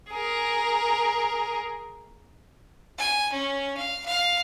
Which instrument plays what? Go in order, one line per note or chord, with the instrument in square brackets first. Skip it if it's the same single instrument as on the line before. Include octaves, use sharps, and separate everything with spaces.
[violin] G#4 A#4
[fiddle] G#5
C#4
F5
F5